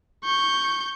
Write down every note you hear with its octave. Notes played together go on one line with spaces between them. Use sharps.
C#6 G6